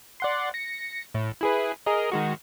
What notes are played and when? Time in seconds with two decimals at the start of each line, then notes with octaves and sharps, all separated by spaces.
0.20 D5 F#5 C6
0.54 A#6 C#7
1.14 A2
1.41 E4 G#4 B4
1.86 G#4 A#4 D#5
2.12 D#3 G#3 F#4